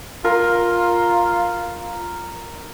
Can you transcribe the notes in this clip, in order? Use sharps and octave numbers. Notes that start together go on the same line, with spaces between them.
F4 A#4